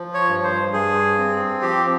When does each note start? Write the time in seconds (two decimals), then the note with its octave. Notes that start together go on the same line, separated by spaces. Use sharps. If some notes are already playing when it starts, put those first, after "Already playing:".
Already playing: F3
0.14 C#5
0.29 G2
0.44 C5
0.73 G2 G#4
1.18 C4
1.62 F3 G4